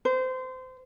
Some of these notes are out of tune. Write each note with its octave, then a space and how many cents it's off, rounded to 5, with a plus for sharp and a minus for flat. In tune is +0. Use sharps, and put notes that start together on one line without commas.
C5 -25